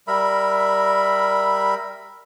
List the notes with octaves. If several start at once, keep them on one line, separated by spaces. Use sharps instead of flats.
G3 A#4 E5 B5